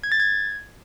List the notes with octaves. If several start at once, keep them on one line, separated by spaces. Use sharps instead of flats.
G#6
A6
G#6